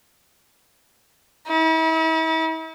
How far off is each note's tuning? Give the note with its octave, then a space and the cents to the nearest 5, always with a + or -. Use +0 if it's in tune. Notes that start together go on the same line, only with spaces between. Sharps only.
E4 -45